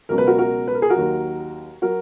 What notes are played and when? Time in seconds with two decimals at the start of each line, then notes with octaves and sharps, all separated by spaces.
0.09 C#2 B2 F#3 A#4
0.18 B4
0.27 F#4 A#4
0.38 F#4 A#4
0.68 B4
0.74 A#4
0.82 G#4
0.90 F#4 A#4
0.95 D#2 D#3 F#3
1.82 F#3 F#4 A#4